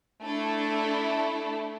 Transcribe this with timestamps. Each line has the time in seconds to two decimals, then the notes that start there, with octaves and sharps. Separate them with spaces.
0.24 A3 D4 E4 A4